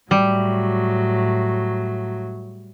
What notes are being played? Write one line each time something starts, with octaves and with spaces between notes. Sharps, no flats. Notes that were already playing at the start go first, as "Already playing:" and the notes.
A2 F#3 G3